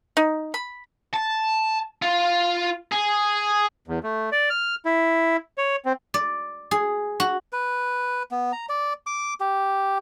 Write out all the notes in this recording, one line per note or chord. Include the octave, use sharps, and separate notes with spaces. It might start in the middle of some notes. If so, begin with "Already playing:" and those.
D#4
B5
A5
F4
G#4
E2
A3
D5
F6
E4
C#5
C4
D5
G#4
F#4
B4
B3
A#5
D5
D6
G4